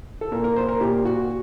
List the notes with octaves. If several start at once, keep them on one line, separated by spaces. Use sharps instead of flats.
A4
A#2 A#4
A#4
C5
A#4
A#2 G4
F#4